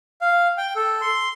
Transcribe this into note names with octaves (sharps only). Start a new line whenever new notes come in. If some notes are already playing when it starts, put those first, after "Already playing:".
F5
G5
A4
C6